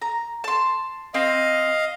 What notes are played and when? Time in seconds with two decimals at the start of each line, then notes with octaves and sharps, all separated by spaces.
0.02 A#5
0.44 A5 C6
1.14 C4 D#5 F5